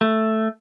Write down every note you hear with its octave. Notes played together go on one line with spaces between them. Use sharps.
A3